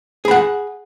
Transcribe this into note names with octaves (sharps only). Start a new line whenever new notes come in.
G#4 F#5 B5